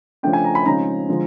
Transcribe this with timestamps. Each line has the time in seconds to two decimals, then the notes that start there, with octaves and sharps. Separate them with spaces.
0.23 C#3 F3 A3 D4 G5
0.33 G#5
0.44 A#5
0.55 B5
0.66 C#3 F3 G#3 C4 D#4 A#5
1.09 D3 F3 G#3